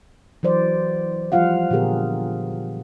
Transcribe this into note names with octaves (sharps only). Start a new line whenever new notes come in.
E3 F#3 C5 D5
F3 G3 F4 F5 F#5
A#2 D3 B3 G4 G#4 A#4